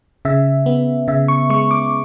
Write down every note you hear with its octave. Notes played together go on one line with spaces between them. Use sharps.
C#3 E5
B3
C#3 E5
C#6
G#3 C#6
D6